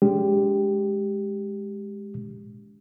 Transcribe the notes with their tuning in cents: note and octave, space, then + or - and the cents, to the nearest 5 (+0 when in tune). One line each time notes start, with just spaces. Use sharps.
G#3 +0 D4 -45 G4 +0